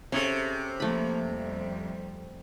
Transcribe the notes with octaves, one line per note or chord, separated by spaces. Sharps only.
C3 C#4 G#4 A4
F3 A3 A#3 B5
F2 G3